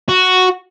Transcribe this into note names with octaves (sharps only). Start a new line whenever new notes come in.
F#4